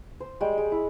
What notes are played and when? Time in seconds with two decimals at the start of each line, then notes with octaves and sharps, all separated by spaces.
0.20 C5
0.40 G3 G#3 C#5 G5
0.58 G#3
0.72 E4